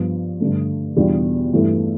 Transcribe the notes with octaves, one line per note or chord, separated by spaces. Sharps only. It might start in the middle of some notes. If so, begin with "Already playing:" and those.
Already playing: G2 F3 B3
G2 D3 A3
E2 B2 G3 D4 F4
G2 E3 A3 E4